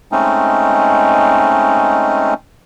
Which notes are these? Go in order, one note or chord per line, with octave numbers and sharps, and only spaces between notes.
G#3 A3 C4 C#4 D#4